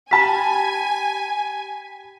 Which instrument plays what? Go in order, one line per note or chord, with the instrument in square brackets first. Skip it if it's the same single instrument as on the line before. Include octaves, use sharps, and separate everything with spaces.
[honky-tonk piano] G4 A5 B5 [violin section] G#5 [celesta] B6